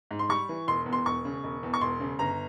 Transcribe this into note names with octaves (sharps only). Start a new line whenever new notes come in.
G#2
C6
G3 C#6
E3
E1 C6
E2
C6
E1 C#6
C#3
E1
E2
C#6
E1 C6
C#3
G1 A#5